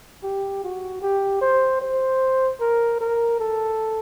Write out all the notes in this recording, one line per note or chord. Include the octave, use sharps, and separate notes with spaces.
G4
F#4
G4
C5
C5
A#4
A#4
A4